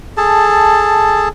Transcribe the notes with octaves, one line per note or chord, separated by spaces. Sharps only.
G#4 A4 A5